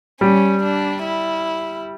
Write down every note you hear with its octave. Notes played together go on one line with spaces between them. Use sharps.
G3 C#4
D4
E4